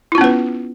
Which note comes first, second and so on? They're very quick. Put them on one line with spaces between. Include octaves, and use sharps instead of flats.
E4 F4 C#4 B3 B4